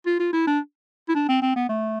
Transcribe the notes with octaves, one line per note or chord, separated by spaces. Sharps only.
F4
F4
E4
D4
E4
D4
C4
C4
B3
A3